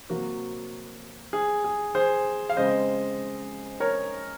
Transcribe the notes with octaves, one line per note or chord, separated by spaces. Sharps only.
C3 F#3 A#3 F#4
G#4
G#4
G#4 C5
F5
C#3 G#3 C4 C5 D#5
A#4 C#5